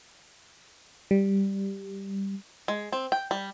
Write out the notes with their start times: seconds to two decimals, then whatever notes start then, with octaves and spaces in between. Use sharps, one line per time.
1.11 G3
2.68 G#3
2.92 C4
3.12 G5
3.31 G3